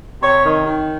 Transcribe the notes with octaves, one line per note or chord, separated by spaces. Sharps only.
C3 C#5
D#3
D#3